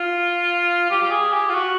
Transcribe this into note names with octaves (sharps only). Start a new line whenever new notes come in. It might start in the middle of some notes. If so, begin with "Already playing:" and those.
Already playing: F4
G4
G4
G#4
G4
F4
F#4